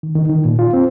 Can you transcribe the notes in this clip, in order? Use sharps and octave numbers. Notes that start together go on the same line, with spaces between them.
D#3
D#3
D#3
A#2
F4
C4